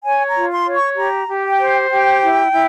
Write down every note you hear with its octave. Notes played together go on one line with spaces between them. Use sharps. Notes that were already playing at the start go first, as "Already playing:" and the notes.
C#5 G#5
A#5
F4
C6
C#5
C#6
G4 A#5
G4
G5
C5
G4 G5
E4
E4